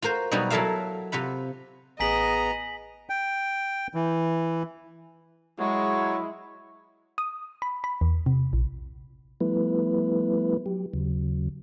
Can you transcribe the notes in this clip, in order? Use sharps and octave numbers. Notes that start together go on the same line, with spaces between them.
F4 F#4 A#4 C5
B2 F#3 G3 D#4 F#4
F#3 E4 A4 A#4 E5 F5
C3 F4 F#5 B5
A1 B3 G#4 D#5 G#5 A#5 B6 F#7
G5
E3
F#3 G#3 E4 C#6
D#6
B5
B5
E2
C3
A#1
F3 G3 A3 B3 E4 B4
F#3 G4
D#2 C#3 F#3